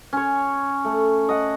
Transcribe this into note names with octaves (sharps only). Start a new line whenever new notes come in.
C#4 C#5
A3
D#5 F#5